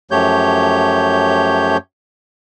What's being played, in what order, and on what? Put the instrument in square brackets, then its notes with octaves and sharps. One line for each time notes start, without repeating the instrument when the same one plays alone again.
[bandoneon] F#2 F3 A3 G4 C#5 G6